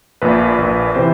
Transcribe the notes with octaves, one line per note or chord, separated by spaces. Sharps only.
A#1 A#2 B4
A#1 A#2
C3 E3 C5